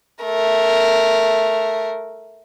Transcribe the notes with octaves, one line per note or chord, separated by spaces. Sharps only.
A3 A#4